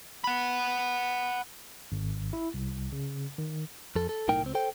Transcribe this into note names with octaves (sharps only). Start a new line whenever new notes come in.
F#5 B5
G#1
E4
C2
C#3
D#3
F2 A4
A4
B1 A2 D#4 A#4 G5
C#2 C4
A4 C5 G5